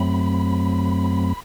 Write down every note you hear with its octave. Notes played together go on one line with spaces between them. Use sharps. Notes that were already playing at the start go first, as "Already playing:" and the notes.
Already playing: F#2 F#3 A3 C4 B5